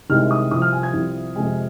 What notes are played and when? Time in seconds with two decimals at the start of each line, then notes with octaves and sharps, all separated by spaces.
0.10 C2 C3 D#3 G#3 F6
0.31 D#6
0.51 C2 C3 F3 D#6
0.62 F6
0.73 G#5
0.83 G#6
0.93 C2 C3 F3
1.35 F2 C3 G#3 G#5